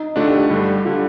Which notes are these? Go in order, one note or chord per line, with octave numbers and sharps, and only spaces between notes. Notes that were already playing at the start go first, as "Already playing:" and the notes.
Already playing: D#4
D3 A3 D4 F4
G4
A4
G2 D3 G3
D3 G3 F4